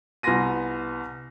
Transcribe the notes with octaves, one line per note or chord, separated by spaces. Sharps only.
C2 B3 G#5 C6 A#6 D#7